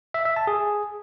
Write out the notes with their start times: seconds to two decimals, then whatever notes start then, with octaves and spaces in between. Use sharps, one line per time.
0.14 E5
0.25 E5
0.36 A5
0.47 G#4